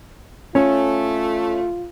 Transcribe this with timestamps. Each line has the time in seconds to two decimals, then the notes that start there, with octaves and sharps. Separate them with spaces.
0.55 A3 C#4 F4